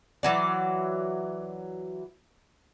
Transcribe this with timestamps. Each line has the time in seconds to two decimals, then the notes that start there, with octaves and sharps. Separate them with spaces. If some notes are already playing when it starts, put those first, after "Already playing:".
0.23 E3 F#3 D5